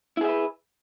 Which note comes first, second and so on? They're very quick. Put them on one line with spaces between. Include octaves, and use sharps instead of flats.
E4 G#4 E5 B4